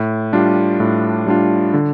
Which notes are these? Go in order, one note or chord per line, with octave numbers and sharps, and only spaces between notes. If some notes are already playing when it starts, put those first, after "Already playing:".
Already playing: A2
G3 D4 F4
A2
G3 D4 F4
D3